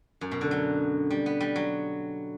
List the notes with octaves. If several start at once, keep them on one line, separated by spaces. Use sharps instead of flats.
F#2
B2
D3
F#3
G3
B3
G3
F#3